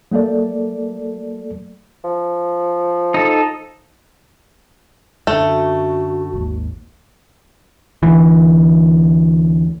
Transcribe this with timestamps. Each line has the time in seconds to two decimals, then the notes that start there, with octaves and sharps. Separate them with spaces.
0.12 F#3 A3 A#3 A4 D5
2.04 F3
3.14 D#4 A4
5.27 F#2 D3 A3
5.48 F#4
6.34 G#1 D#2
8.03 D2 E3